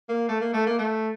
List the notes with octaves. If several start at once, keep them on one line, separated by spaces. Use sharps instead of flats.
A#3
A3
A#3
A3
A#3
A3